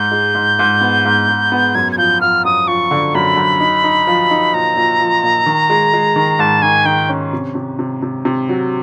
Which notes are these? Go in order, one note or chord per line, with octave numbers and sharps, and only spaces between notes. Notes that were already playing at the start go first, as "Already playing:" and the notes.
Already playing: G#2 G6
G#3
G#2
G#2
B3
G#2
G#2
B3
F#2 G#6
G#6
F3 G6
F3 F6
F#2 D#6
F3 C#6
D3
F#2 B5
F#2
D#4
D#4
F3
D#4
A#2 A#5
A#2
F3
A#2
D#3
G#3
G#3
D#3
G#2 A5
D#3 G#5
D#3 G5
C#4
C3
C3
C3
C3
C3
F#3